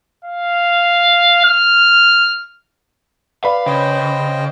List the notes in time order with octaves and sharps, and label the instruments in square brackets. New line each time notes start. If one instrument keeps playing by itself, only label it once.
[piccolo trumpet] F5
F6
[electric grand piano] B4 D5 B5 [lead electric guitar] F5
[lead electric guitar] C#3 [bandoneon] C5 D#5 G5